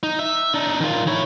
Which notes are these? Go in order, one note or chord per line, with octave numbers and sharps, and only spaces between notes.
D#4
E5
D4 D#4
D#3 F4
E4 C#5